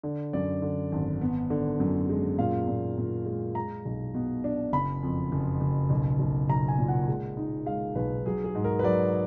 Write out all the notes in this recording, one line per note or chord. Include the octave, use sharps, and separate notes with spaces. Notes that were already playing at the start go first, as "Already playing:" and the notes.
D3
F#2 D5
D3
G#1
B3
D3
F#2
G#3
A#2 F5
A#2
A#2
G#3
G#3 A#5
B1
B2
D4
F#1 B5
F2
F#1
F#1
B1
B1
B1 A#5
G#5
A#2
F#5
G#3
D#4
G#3 F5
B1 B4
F#3 G#4
G#4
G#2
A#4
B4
F#3 D5